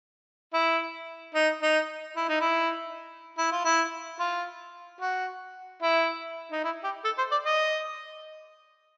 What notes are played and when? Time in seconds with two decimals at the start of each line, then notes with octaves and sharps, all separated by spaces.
0.54 E4
1.35 D#4
1.63 D#4
2.17 E4
2.29 D#4
2.40 E4
3.39 E4
3.52 F4
3.65 E4
4.20 F4
5.01 F#4
5.82 E4
6.52 D#4
6.64 E4
6.84 G4
7.05 A4
7.18 C5
7.32 D5
7.46 D#5